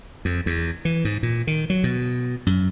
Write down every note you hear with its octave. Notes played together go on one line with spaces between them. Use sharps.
F2
E2
E3
G#2
A#2
D#3
F#3
B2
F#2